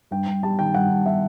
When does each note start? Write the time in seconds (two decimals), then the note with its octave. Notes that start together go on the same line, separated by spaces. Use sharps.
0.11 G2 G5
0.28 G2
0.43 G3 A5
0.59 D#3 G5
0.74 G2 F#5
0.91 G2
1.06 G3 E5